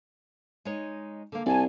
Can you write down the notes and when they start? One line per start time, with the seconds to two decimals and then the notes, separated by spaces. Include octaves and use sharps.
0.65 G#3 D#4 C#5
1.32 D3 A#3
1.46 C2 D5 G#5 A5